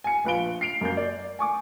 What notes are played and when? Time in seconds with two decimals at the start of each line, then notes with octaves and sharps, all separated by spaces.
0.04 G#5 C#7
0.25 A#1 F3 B4 F5 D7 G7
0.61 C7 D7 F7
0.81 F#2 A#3 G6
0.97 D5
1.39 G#5 C#6 D6